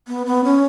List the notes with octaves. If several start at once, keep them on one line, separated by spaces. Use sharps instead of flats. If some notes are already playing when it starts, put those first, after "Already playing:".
B3
B3
C#4